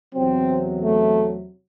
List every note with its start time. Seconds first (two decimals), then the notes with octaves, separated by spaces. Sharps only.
0.14 E2 C3 F#3 C4
0.81 A3